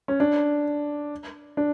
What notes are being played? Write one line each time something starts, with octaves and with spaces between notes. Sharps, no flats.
C#4
D4
D4